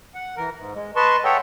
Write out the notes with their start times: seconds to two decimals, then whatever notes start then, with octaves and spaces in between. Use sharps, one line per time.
0.15 F#5
0.37 E3 A#4
0.58 G#2
0.75 G#3
0.96 B4 D#5 A5 C6 C#6
1.24 G#4 A4 C#5 E5 F#5 G5